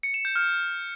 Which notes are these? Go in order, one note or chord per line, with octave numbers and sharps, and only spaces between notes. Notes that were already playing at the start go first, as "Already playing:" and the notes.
C#7
E7
G6
F6